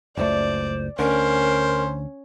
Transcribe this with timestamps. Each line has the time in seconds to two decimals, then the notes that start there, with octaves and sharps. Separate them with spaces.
0.17 F#1 C#2 A3 C5 D5
0.99 D2 D3 C#4 A#4 C5